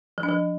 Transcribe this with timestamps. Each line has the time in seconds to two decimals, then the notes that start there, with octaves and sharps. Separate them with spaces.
0.18 F3
0.23 D4
0.29 F3